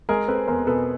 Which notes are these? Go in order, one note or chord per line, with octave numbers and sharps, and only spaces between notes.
G#3 G#4 A#4
C4 A4 B4
E2 A#4 C5
B2 A4 B4